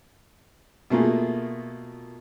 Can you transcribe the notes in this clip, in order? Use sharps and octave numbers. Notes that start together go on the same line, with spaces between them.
B2 A3 A#3 F4 G#4